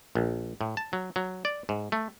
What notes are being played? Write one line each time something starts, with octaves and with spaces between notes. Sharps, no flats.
A#1
A2
A5
F#3
F#3
D5
G#2
A3